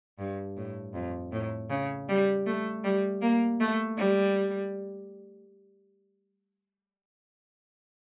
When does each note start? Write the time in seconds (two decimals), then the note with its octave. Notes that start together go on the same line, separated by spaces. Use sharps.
0.19 G2
0.57 A2
0.94 F2
1.32 A2
1.70 C#3
2.09 G3
2.46 A3
2.84 G3
3.21 A#3
3.60 A3
3.97 G3